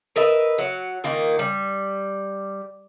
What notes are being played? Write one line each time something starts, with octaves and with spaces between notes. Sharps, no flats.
A#4 B4 D#5 E5
F#3
A#2 D#3 A#3
G3